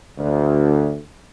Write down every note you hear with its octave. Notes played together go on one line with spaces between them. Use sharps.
D2